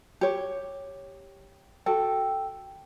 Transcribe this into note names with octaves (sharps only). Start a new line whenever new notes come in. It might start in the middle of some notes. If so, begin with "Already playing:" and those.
G4 C#5
F#4 A4 G5